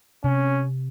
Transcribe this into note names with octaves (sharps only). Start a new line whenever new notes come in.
C3 C#4